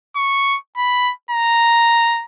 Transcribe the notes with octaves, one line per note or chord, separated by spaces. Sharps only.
C#6
B5
A#5